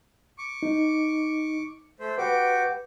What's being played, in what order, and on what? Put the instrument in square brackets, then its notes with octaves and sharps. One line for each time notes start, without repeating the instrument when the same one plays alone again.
[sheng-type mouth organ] C#6 D6
[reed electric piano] D#4
[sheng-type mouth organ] A3 C5
[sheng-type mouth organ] F#4 G4 D6 [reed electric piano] B4